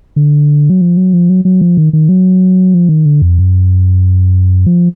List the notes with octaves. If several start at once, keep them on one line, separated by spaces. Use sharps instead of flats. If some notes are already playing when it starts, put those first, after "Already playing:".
D3
F#3
F3
F#3
F3
F#3
F#3
F3
D#3
D#3
F#3
F3
D#3
D3
F2
F#2
F3